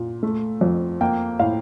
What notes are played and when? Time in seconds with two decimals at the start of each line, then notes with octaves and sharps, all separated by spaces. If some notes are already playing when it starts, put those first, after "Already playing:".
Already playing: A#2
0.23 A3
0.61 F2
1.01 A#3 G5
1.39 A2 F5